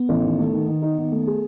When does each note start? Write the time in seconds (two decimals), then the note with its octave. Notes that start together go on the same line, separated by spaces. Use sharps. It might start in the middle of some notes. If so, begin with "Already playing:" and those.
Already playing: B3
0.09 A1
0.23 D#3
0.38 A3
0.53 D#3
0.68 D#3
0.82 D#4
0.98 D#3
1.12 A3
1.27 G#4